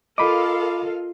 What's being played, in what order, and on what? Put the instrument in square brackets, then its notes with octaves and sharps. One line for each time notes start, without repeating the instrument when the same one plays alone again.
[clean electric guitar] F4 D#5 [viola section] A4 A#4 F5 [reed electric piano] B5 D6